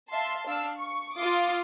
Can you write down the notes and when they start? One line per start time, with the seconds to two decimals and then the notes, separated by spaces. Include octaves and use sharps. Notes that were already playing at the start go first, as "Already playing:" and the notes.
0.11 E5 F5 A5 C6
0.47 D4 F5 E6
0.77 C#6
1.16 F4 C6 D6 D#6